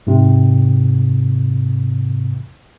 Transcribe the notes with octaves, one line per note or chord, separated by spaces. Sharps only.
G#2 C3